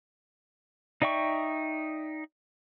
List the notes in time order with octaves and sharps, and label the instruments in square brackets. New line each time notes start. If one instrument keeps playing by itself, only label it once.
[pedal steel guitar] D#4 D5 E5 G5 C#6